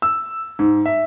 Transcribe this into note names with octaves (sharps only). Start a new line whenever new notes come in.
E6
G#2
E5